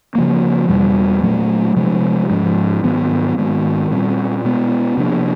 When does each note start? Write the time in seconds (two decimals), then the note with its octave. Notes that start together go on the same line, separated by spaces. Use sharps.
0.15 C#3 F3 A#3
0.69 E2 B2 G3
1.23 A#2 F#3 A3
1.76 C3 F3 G#3
2.29 G#2 F3 G#3
2.84 G#2 D#3 F#3 B3
3.37 G#2 D#3 G#3 B3
3.91 A#2 G3 C4
4.44 B2 G#3 B3
4.97 C3 F3 A#3 D4